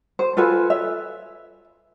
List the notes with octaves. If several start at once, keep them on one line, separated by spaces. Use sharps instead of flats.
C5
F4 A4 B4 G#5
E5